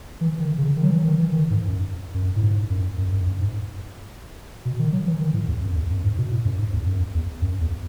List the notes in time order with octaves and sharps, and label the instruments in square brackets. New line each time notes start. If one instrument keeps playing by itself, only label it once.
[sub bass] E3
D#3
C#3
D#3
F#3
E3
D#3
E3
D#3
G#2
F#2
F#2
A2
G#2
F#2
F#2
F#2
F#2
G#2
B2
D#3
F#3
E3
D#3
A2
E2
F#2
E2
F#2
G#2
B2
A2
F#2
G#2
E2
F#2
E2
F#2
E2